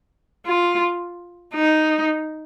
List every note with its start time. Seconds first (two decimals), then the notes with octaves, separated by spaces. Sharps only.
0.46 F4
1.54 D#4